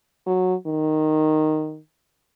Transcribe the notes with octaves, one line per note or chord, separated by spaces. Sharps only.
F#3
D#3